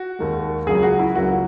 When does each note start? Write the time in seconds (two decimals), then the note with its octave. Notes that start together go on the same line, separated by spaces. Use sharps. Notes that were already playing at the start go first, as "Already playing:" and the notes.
Already playing: F#4
0.19 D#2 D#3 G#3
0.66 C#2 C#3 F#3 A#3 G#4
0.83 F#4
0.99 E4
1.15 C#2 C#3 F#3 A#3 F#4